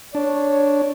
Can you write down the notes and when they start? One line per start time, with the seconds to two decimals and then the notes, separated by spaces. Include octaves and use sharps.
0.15 D4 C#5